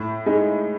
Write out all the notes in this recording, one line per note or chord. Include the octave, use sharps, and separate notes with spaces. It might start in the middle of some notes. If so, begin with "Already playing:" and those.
Already playing: A2
G#3 D#4